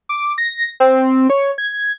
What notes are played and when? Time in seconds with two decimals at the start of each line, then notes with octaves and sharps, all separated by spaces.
0.09 D6
0.38 A#6
0.80 C4
1.30 C#5
1.58 G#6